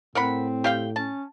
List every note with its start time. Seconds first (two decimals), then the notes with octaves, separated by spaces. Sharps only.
0.15 A2 C4 A#4 F#5 B5
0.64 G4 F5 G5
0.96 C#4 A5